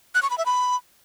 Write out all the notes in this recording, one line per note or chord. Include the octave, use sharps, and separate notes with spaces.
F#6
C#6
B5
E5
B5